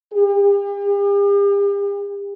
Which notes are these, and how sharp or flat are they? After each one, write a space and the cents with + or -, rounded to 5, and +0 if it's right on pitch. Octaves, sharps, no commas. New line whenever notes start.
G4 +45